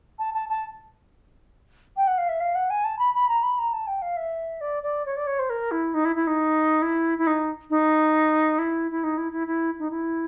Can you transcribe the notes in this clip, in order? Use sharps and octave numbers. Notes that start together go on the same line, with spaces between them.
A5
A5
A5
G5
F#5
F5
E5
F5
F#5
G#5
A5
B5
B5
A#5
B5
A#5
A5
G5
F5
E5
D5
D5
C#5
D5
C#5
C5
A#4
E4
D#4
E4
E4
D#4
E4
E4
D#4
D#4
E4
E4
D#4
E4
E4
E4
D#4
E4